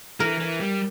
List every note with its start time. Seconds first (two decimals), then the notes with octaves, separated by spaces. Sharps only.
0.20 E3 A#4
0.40 E3
0.60 G3